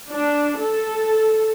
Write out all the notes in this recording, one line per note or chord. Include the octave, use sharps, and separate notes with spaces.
D4
A4